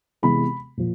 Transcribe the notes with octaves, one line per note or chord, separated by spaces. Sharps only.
C3 E3 G#3 B3 B5
A#2 F3